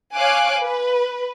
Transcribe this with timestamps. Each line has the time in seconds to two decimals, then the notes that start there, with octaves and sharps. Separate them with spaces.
0.14 C#5 F5 G#5 D6 F#6
0.60 B4